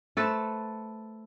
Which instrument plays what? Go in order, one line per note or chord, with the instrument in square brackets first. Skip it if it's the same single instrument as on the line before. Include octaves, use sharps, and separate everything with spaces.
[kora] A3 A4 B4 C5